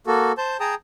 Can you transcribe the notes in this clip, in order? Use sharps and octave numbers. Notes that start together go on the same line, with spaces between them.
A#3 F#4 A4
C5 A5 G6
G#4 G5 A5 A#5 D#6